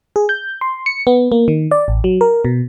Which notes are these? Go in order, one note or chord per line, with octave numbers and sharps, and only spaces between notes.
G#4
G6
C6
C#7
B3
A#3
D#3
D5
A1
F#3
A#4
B2